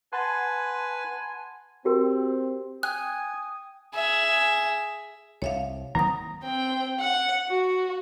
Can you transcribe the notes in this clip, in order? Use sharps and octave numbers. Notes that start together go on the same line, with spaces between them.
B4 F#5 G#5 A5 C6
C4 F#4 G4 A#4
G5 G#5 D#6 F#6
G#4 E5
C2 C#5 E5 F5
D#3 F#3 A#3 C4 A#5 D#6
C4 G5
F#5
F#4